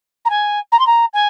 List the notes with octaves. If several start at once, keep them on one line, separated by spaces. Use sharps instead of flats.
A#5
G#5
A#5
C6
A#5
G#5